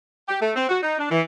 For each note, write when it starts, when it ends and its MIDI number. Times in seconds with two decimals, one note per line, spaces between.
0.28 0.40 67
0.41 0.50 57
0.55 0.64 60
0.69 0.78 66
0.83 0.95 63
0.98 1.07 62
1.10 1.21 52